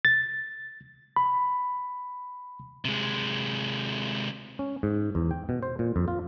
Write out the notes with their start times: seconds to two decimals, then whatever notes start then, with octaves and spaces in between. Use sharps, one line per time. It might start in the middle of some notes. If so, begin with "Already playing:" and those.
0.05 A6
1.16 B5
2.85 C3 G#3
4.59 C#4
4.83 G#2
5.15 E2
5.31 G5
5.49 B2
5.62 C5
5.79 A#2
5.96 F2
6.08 F4